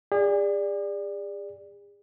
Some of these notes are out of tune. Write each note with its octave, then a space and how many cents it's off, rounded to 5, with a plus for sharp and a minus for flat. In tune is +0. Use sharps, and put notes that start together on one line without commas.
G#4 -40 D5 +0